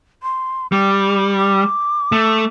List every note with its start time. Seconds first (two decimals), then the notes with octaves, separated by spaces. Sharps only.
0.23 C6
0.72 G3 D6
1.38 D6
2.12 A3